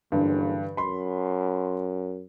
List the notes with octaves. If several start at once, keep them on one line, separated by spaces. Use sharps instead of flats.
F#1 G2 D3 E3
F#2 B5 C6